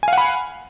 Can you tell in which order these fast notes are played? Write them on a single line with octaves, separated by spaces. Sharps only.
G#5 F5 F#5 B5